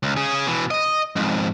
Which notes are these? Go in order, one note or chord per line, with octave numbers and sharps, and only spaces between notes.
C#2
C#4 G#4
B2 E3
D#5
F2 G#2